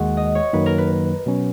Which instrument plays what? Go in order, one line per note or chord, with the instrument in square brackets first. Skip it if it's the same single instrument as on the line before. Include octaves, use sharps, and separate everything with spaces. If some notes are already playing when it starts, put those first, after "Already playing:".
Already playing: [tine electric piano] D#2 D#3 G#3 [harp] F#4
[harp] D#5
C#5
[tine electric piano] F#2 D#3 F#3 A#3 [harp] B4
[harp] A#4
B4
[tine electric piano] B2 F#3 C#4